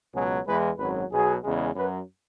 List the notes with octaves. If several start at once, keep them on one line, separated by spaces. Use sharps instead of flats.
C#2 B2 F#3 G#4
E2 E3 G#3 B4
G#1 F#2 F#3 B4
B1 B2 F#3 G#4
E2 C#3 G#3
F#2 F#3 B4